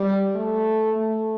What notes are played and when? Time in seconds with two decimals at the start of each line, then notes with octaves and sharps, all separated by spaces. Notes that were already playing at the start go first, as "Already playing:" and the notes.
Already playing: G3
0.35 A3
0.97 A3